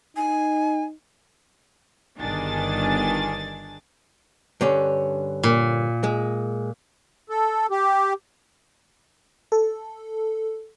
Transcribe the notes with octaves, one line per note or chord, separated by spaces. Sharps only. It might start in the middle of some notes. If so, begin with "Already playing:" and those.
D#4 G#5
G1 D#3 D4 G#4 A6
G2 D3 C#4
A#2
G#3
A4
G4
A4